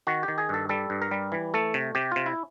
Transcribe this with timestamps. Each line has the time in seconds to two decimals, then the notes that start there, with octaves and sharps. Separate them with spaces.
0.07 D#3 F#4
0.23 G4
0.28 D#3
0.38 G#4
0.49 G2 A4
0.69 G3 A4
0.90 G2
1.02 A#4
1.11 G3
1.32 E3
1.54 A3 A4
1.74 C3
1.95 C3 G4
2.12 C3 F4
2.26 E4